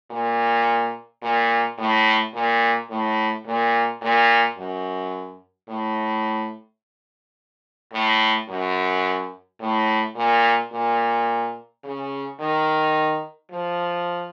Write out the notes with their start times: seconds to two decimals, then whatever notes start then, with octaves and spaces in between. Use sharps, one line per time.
0.11 A#2
1.22 A#2
1.78 A2
2.34 A#2
2.90 A2
3.46 A#2
4.02 A#2
4.57 F#2
5.68 A2
7.93 A2
8.49 F#2
9.60 A2
10.16 A#2
10.72 A#2
11.84 C#3
12.40 D#3
13.51 F3